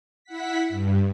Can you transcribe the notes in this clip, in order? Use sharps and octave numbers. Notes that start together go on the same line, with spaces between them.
E4 F#5 B6
G2